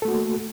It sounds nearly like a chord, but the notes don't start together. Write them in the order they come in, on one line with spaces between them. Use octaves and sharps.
A4 A3 F#4 A#3